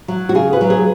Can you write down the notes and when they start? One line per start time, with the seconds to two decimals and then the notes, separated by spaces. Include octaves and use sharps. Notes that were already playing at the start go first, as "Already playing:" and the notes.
0.08 F#3
0.29 F#4
0.35 C#3 G#4
0.53 B4
0.61 F#3
0.70 G#4